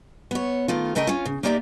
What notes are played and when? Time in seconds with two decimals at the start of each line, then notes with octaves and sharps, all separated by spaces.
0.31 B3 C#5
0.68 D#3 A3 F4
0.95 C#3 A3 A#4 D#5 F#5 G5
1.07 C#4 F4
1.25 C#3
1.43 A#3 D#4 G4 D5 E5 A#5